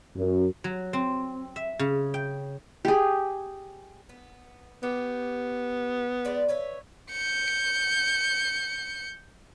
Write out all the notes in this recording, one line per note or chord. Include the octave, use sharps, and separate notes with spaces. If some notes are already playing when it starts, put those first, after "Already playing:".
F#2
F#3
C4
E5
C#3
G5
G4 G#4
B3
B3 G4
G#3 B4 D5
B4 C#5 E5
G6 C#7